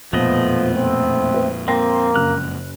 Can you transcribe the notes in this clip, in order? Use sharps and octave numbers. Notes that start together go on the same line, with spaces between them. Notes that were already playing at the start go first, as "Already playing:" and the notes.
E1 F2 A#2 F3 A3 B3 D#5
C4
B4
A#3 C4 G5 C6 A#6
F#1 F6 F#6